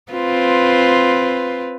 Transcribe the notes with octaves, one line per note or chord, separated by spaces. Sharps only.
C4 F4 B4